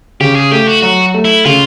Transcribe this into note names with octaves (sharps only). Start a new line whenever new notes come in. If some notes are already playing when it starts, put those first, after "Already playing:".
C#3 G4
G#4
A3 G4
F#4
F#3 F#4
A3
E4
C#3 F4